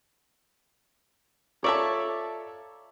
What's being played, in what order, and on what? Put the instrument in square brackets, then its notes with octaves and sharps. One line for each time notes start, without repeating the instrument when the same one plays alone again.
[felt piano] F4 A4 A#5 [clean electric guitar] C#5 [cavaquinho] D5 E5 A5